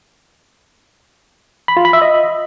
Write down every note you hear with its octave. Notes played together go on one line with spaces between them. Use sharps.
B5
F4
B5
E5
D#5